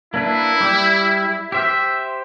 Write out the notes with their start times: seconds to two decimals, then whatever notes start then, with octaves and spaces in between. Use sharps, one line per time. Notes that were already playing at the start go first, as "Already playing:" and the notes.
0.14 A#3 D4 E4 B4
0.61 G3 G4 D6
1.52 G4 C5 E5 F6